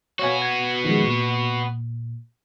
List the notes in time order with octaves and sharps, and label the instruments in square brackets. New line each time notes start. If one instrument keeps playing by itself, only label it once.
[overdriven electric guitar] B3 F#4 [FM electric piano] C#5 F5 G#5
[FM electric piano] G#6
D#3 F3 G#3
A#2